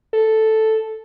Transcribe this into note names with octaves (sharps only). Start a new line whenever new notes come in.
A4